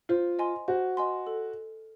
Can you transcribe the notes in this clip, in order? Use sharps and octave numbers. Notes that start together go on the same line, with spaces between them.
F4 C5
D#5 G#5 C6
F#4 C5
D#5 G#5 C6
A4